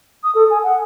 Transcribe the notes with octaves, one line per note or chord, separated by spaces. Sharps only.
D#6
A4
G#5
F#5